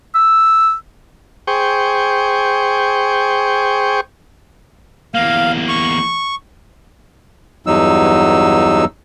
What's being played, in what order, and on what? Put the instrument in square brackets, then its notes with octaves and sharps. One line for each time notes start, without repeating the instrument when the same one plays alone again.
[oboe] E6
[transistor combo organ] G#4 C5 G5 C#6
[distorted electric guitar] E2 A#3 [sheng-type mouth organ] F5
[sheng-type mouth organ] C#6
[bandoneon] E2 G2 F#3 D#4 E6